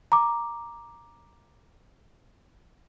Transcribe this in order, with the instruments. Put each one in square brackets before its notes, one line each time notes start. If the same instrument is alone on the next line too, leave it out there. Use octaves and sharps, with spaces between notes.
[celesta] A#5 D6